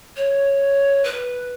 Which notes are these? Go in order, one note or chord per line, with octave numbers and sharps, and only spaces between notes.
C#5
B4